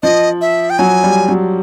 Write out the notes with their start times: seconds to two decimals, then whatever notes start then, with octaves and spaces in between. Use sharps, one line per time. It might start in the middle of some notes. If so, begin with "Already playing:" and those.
0.03 F3 D#5
0.41 E5
0.70 G5
0.79 F#3 G#5
1.04 G3
1.29 F#3